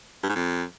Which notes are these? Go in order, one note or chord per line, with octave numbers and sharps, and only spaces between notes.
G2
G#2
F2